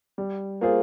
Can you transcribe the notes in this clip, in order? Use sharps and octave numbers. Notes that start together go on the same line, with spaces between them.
G3
A#3 F4 G#4 C5